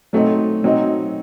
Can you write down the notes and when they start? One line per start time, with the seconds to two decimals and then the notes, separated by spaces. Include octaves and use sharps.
0.13 F#3 A3 C4 D#4
0.64 F#3 C4 D#4